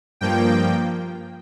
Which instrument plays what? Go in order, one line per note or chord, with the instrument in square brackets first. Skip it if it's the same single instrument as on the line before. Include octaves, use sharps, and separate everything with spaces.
[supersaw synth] G2 F3 A#3 G5